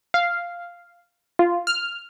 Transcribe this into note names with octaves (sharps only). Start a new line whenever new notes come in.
F5
F4
F6